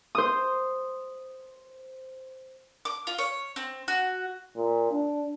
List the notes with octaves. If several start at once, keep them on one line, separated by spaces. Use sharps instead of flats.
C5 D#6
D6
F4
C#5
C4
F#4
A#2
D4